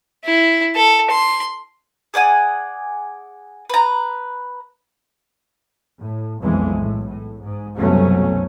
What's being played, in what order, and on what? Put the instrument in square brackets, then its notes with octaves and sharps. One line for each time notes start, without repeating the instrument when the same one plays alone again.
[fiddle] E4
A4
C6
[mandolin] G#4 D5 F#5 G#5
B4 A#5
[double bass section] A2
B1 F2 E3 G#3
A2
A2
G#2
C2 F#2 B2 F#3 A3 C#4